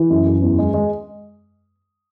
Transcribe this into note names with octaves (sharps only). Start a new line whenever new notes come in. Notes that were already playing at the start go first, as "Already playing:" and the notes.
Already playing: E3
F#2
F#2
E2
G#3
G#3